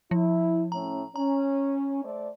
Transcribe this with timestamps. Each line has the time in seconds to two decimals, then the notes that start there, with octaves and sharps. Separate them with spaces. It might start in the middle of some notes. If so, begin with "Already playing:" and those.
0.11 F3 E4
0.72 A2 C#4 A#5
1.16 C#4 A#5
2.05 A3 C5 D5